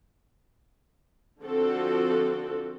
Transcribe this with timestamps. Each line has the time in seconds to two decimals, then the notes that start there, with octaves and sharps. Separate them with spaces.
1.43 D3 F3 C4 F#4 A4